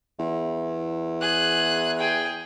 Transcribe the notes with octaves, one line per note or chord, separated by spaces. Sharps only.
E2
G#4 F#6
G#4 G5